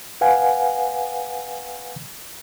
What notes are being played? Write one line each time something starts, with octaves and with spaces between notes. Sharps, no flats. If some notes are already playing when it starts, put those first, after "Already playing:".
B4 F5 F#5 G#5